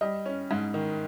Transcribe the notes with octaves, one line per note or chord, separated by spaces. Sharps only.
G3 D#5
C#4
G#2
D#3